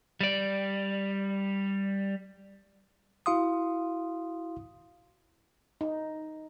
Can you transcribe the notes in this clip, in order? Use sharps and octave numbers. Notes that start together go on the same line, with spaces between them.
G3 D5
E4 F#4 F5 C6 D#6
D#4